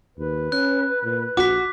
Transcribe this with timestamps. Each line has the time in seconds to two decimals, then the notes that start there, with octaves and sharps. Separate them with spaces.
0.18 D#2 B4
0.52 C#4 F#6
1.03 A#2
1.37 A#1 F#4 D6 B6